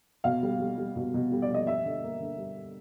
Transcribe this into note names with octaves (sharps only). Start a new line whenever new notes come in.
B2 F5
G3
G3
G3
B2
B2
G3
D5
B2
D#5
G3 E5
D3
A#3
D3
G3